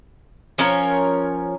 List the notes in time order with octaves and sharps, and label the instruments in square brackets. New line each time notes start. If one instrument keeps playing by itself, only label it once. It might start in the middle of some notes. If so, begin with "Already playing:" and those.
[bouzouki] F3 C#4 A#4 C#5